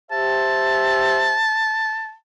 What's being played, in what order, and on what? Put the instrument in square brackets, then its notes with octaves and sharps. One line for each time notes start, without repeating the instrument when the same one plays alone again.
[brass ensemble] G4 C5 E5 [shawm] A5